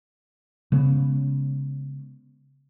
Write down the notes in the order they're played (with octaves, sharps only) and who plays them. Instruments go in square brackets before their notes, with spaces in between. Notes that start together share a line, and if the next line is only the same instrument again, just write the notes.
[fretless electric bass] C#3 G#3 B3 C#4